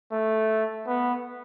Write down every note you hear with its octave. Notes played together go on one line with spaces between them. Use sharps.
A3
B3